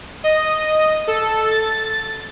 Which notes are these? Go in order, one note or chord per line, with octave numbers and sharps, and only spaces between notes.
D#5
A4
A6